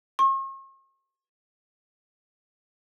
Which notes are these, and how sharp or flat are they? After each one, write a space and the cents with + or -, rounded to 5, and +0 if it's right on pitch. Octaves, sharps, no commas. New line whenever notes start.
C#6 -45